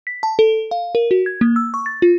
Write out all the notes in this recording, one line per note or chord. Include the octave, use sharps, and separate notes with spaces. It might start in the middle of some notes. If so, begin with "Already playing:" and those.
B6
A5
A4
F5
A#4
F#4
G#6
A#3
E6
C#6
A6
F4